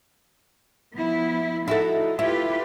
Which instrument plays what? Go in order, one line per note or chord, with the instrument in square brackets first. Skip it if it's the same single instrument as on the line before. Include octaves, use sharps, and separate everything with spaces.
[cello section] F3 B3 E4
[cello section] D#4 [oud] E4 F#4 A4
[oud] E4 [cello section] F4 G4 B4